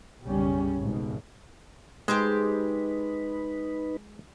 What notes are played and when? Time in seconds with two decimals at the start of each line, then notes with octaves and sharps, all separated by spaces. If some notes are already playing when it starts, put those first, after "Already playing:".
0.23 B1 F#2 C#3 G3 C#4
0.80 G#1 G#2 B2
2.08 G#3 D#4 G4 G#4 B4 C5